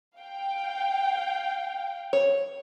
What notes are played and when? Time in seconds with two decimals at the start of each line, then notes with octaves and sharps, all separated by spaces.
0.18 F5 G5
2.13 C#5